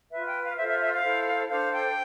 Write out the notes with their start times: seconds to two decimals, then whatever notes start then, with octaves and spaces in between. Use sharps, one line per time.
0.11 F4 B4 E5
0.27 G5
0.42 F5
0.57 F4 A4 C5 E5
0.68 E5
0.80 E5
0.92 F5
1.03 E4 A4 C5
1.49 D4 A4 C5 F5
1.72 G5